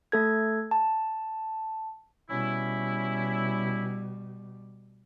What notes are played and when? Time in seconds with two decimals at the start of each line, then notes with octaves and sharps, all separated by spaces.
0.12 A3 A4 G#6
0.71 A5
2.30 B2 G3 C#4 E4